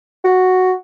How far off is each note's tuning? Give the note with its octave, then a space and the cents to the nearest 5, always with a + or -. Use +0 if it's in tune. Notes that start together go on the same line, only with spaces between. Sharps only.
F#4 +0